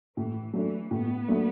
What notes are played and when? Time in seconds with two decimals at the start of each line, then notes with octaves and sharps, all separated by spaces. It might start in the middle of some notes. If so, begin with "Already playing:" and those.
0.17 A2 E3
0.53 E3 F#3 A3 D4
0.91 A2 B3
1.28 F#3 A3 D4